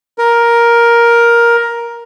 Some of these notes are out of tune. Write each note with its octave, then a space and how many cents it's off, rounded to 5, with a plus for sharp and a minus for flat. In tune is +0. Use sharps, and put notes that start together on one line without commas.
A#4 +10